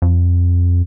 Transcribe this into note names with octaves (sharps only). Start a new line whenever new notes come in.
F2